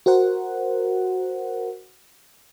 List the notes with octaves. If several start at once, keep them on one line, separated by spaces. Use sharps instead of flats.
F#4 A#4 C5 F#5